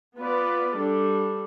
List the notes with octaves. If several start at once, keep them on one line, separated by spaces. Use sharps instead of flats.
B3 F4 B4 D5
G3 D4 A4